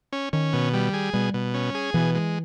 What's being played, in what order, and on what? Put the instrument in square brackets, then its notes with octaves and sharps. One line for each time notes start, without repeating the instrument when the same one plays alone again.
[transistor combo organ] C#4
[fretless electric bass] D#3 [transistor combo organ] C#4
[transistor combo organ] B2
G3
G#4
[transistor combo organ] B2 [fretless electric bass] G3
[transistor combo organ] B2
C#4
G#4
[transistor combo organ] B2 [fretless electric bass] E3
[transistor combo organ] G#3